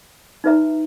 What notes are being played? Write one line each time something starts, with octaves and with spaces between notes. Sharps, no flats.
D#4 F#4 B4 E5 A#5